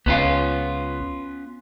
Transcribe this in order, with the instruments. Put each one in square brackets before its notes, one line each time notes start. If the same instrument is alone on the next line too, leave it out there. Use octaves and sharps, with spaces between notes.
[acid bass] C#2 [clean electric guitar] B3 C#4 F4